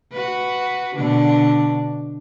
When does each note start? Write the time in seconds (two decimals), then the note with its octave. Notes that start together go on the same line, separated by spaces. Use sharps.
0.12 F#4 B4
0.95 B2 D3 D4